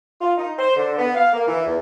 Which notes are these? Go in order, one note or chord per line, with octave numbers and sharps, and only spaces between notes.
F4
D#4
C5
D3
B3
F5
A#3
E3
E2